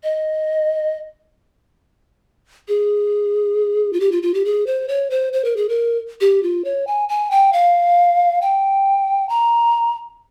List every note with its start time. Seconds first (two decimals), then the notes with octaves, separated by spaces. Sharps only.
0.03 D#5
2.68 G#4
3.93 F4
4.00 G4
4.12 F4
4.23 F4
4.34 G4
4.45 G#4
4.67 C5
4.88 C#5
5.10 C5
5.33 C5
5.45 A#4
5.56 G#4
5.69 A#4
6.21 G4
6.43 F4
6.65 C#5
6.87 G#5
7.09 G#5
7.31 G5
7.53 F5
8.42 G5
9.29 A#5